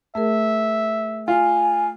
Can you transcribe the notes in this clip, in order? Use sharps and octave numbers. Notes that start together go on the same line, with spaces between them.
A3 G#4 A#4 E5
F4 G#5